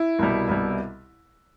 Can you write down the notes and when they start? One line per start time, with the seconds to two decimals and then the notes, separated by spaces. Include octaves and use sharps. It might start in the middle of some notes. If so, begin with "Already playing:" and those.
Already playing: E4
0.19 C2 B2 G3
0.48 C2 B2 G3